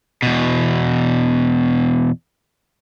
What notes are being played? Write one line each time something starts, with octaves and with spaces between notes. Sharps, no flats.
E2 B2